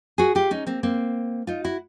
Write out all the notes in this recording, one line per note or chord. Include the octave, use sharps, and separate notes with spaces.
F#4 G#4
F4 G4
C#4 D#4
A#3 C4
A#3 C4
D#4 F4
E4 F#4